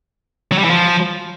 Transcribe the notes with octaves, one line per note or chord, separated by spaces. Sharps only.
F#3
G3
E3
F3